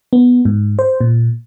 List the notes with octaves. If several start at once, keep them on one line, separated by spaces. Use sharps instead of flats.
B3
G#2
C5
A#2